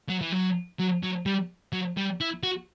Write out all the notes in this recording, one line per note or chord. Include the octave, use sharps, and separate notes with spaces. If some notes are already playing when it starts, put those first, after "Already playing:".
F#3
E3
F#3
F#3
F#3
G3
F#3
G3
E4
F#4